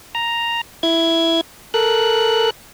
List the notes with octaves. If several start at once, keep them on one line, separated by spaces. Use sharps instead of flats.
A#5
E4 G#6
A4 A#4 F#6